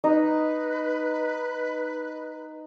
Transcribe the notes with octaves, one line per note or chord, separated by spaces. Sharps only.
D#4 B4